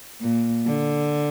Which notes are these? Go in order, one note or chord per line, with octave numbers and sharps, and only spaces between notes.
A#2
D3